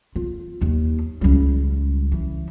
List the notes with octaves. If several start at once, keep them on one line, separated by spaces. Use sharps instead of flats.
F4
D#2
C#2 G3
E3